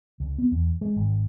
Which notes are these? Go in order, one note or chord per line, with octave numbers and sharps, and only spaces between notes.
C#2
B3
E2
G#3
G#1